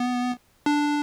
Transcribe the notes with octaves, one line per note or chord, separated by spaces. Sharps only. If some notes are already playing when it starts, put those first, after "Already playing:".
Already playing: B3
D4